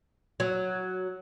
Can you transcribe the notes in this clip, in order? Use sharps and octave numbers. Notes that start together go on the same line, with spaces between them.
F#3